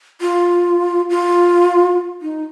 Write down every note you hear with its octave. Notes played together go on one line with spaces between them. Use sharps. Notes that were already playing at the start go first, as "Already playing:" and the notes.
F4
F4
D#4